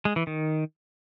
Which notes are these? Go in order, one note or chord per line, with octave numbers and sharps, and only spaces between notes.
G#3
E3
D#3